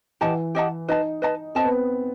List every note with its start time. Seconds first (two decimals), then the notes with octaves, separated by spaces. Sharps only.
0.21 E3 G4 D#5 F#5 A5
0.55 G4 D#5 F#5 A5
0.88 D#4 B4 D#5 A5
1.22 B4 D#5 A5
1.55 C4 A4 D#5 A5
1.64 B3